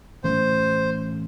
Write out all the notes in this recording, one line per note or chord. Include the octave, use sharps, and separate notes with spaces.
A2 E3 A3 C#4 C5